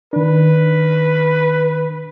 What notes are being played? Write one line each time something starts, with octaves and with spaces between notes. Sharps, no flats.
D#3 D4 B4